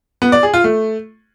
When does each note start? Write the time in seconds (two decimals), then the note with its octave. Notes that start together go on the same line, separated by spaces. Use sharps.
0.22 B3
0.32 D5
0.43 G#4
0.54 F4
0.64 A3